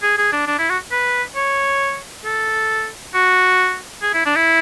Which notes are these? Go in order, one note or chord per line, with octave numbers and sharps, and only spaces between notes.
G#4
G#4
D4
D4
E4
F#4
B4
C#5
A4
F#4
G#4
E4
D4
E4